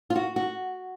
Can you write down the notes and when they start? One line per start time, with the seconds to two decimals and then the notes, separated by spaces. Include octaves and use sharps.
0.10 F4
0.16 F#4
0.36 F#4